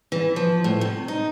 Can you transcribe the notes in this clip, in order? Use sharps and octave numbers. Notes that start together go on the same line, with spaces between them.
E3
F3
A2
C3
D#4